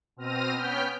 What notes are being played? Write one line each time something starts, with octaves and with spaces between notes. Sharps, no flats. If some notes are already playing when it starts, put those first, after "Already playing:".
B2 C4 F6 A#6 D#7
B3 C#4 G5 F6 G6 B6